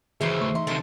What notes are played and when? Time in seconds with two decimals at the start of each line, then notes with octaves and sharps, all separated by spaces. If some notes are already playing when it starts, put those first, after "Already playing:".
0.21 D#2 A#2 C#3 E3 F#4 G#4 C5 E5
0.41 A3 C#6
0.55 D#4 E5 C6
0.67 D#2 C3 A4